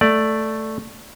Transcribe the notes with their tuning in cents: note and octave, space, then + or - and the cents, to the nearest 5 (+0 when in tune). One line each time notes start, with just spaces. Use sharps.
A3 +0 D5 +0